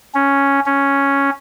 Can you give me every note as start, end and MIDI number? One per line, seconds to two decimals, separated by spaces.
0.15 0.60 61
0.66 1.30 61